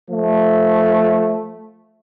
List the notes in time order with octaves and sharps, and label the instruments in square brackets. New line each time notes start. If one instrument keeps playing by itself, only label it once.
[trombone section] F3 A3